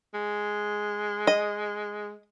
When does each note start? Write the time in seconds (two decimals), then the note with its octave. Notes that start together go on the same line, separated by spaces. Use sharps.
0.14 G#3
1.27 D#5